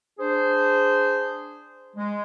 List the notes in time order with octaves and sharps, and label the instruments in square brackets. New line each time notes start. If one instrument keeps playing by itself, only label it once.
[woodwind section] D4 G#4 C5
G#3